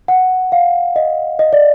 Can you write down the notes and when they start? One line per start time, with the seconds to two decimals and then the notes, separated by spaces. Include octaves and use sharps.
0.08 F#5
0.52 F5
0.96 D#5
1.39 D#5
1.53 D5